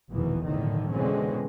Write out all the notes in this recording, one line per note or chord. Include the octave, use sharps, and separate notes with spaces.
F1 A#1 E2 B2 D#3 E3
B1 A2 D3 D#3
B2 D3 E3 G#3 C4 C#4